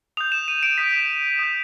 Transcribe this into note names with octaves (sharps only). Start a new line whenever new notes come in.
D#6 G6 F7
E7
D#7
D7
D#6 G6 B6
D#6 G6